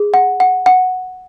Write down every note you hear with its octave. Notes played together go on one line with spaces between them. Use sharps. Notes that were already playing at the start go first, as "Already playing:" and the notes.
Already playing: G#4
F#5
F#5
F#5